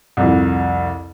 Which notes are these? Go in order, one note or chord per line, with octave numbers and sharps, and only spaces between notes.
C2 F2